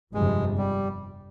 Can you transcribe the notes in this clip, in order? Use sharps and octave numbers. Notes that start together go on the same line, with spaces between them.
G1 F2 C3 G#3
G3